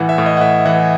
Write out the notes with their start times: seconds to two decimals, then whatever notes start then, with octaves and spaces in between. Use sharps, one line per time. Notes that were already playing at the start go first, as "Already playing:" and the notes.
Already playing: A2 E3 F#5
0.09 E5
0.18 A2
0.26 D#5
0.37 F#5
0.41 A2 E5
0.66 E3 F#5